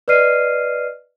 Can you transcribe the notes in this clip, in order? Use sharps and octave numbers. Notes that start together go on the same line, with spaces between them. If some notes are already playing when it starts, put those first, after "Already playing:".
B4 D5 D#5 F6 C7 D#7